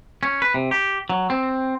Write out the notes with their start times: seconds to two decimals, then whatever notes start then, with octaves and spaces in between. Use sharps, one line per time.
0.23 C#4
0.42 B4
0.54 C3
0.71 G4
1.10 F#3
1.30 C4